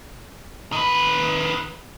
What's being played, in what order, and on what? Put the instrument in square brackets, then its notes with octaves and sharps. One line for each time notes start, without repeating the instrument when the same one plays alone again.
[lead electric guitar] D#3 B4